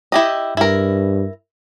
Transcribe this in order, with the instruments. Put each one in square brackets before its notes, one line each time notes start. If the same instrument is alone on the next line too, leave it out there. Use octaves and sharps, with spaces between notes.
[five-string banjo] E4 G4 D#5
[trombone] G2 [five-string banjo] E4 A#4